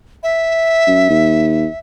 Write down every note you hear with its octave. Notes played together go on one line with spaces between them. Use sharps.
E5
F#2
D#2